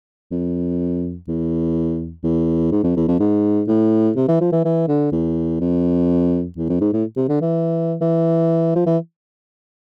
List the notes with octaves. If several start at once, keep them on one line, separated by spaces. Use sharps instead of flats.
F2
E2
E2
G#2
F2
E2
F2
G#2
A2
C3
E3
F3
E3
E3
D3
E2
F2
E2
F2
G#2
A2
C3
D3
E3
E3
F3
E3